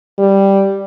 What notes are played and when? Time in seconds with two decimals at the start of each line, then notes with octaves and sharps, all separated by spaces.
0.18 G3